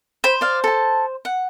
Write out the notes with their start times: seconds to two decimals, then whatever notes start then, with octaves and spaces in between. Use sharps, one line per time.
0.24 C5 B5
0.41 D5 F5
0.64 A4 A5
1.25 F#5